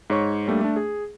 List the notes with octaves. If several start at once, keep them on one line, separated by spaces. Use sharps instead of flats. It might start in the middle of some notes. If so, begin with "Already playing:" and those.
G#2 C#5 C#6
G3 A3 A#3 D4
A3 D4
G#4